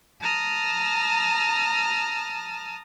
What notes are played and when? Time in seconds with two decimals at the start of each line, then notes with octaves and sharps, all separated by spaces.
0.21 A5 A#5 D#6 F6